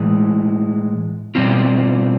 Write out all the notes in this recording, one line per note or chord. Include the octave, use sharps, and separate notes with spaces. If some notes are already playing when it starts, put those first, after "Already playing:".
Already playing: A2 E3 G#3
B2 G3 C4 F4